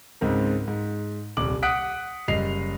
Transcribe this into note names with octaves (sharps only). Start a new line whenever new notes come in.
C#2 G#2 C4 A#4
G#2
D#1 C2 D6 F#7
F#5 D#6 F#6 B6 D7
F#1 G3 D#5 C7 F7